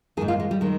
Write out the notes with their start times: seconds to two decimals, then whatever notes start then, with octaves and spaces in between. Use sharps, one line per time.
0.17 D#3 G#4
0.21 G#2
0.28 F4
0.40 G#3
0.51 G3
0.61 D#3 G#3